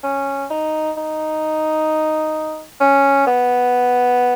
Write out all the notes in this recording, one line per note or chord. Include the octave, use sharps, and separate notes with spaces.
C#4
D#4
D#4
C#4
B3